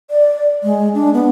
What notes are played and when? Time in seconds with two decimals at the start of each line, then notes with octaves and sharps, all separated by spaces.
0.10 D5
0.63 G#3
0.95 D4
1.14 B3